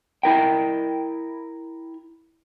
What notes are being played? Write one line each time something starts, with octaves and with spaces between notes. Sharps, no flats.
E4 A#4 G5